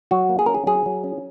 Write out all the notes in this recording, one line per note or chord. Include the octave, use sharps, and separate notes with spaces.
F#3 F#4
A#3
G#4
C#4 A#4
G#4
F#3 G#4
F#3
C#4